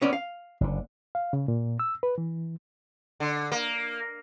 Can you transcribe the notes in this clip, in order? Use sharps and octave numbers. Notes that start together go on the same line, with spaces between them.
B3 C#4 D5
F5
F#1 A#2 D3
F5
C#3
A#2
E6
B4
E3
D3
A#3